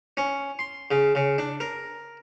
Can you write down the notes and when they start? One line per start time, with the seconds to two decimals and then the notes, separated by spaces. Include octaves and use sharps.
0.17 C#4
0.59 C6
0.91 C#3
1.15 C#3
1.38 D4
1.60 A#4